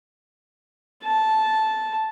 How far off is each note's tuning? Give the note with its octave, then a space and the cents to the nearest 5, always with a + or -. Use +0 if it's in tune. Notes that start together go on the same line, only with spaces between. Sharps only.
A5 -10